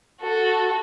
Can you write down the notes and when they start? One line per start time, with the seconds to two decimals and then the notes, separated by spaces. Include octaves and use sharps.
0.22 F#4 A4